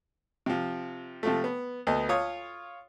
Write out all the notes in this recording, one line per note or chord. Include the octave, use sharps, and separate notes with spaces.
C3 F3
C3 F3 A3
B3
D2 B3 D#5
F4 C#5 D#6